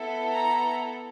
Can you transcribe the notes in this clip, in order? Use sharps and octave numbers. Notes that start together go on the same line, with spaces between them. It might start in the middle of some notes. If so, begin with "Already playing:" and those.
Already playing: B3 E4 A4
A#5